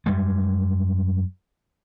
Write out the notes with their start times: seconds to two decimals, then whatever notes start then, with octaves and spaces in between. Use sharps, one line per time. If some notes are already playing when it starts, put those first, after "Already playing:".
0.06 F#2 G3 G#3